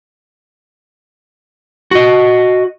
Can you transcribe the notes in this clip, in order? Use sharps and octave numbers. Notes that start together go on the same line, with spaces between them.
F#4 D#5